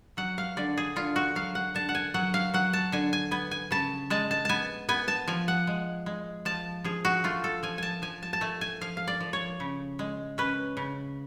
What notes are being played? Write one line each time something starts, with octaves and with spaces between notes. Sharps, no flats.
F#3 F#5
F5
D3 D5
G#4
D3 F4
F#4
F#3 F5
F#5
D3 A5
F#5
G#5
F#3 F#5
F5
F#3 F#5
A5
D3 G#5
G#5
B3 G#5
G#5
C#3 A5
G#3 A5
A5
B3 G#5 A5
B3 G#5
A5
F3 G#5
F#5
G#3
G#3
F3 A5
F3 G#4
F#4
A3 F4
A4
F3 G#5
G#5 A5
F3 G#5
A5
A5
A3 G#5
G#5
F3 F5
F5
D5
F3
C#5
C#3
G#3
C#4 B4
C#3